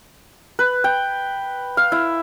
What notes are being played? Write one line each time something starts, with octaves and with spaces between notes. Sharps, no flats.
B4
G5
F5
E4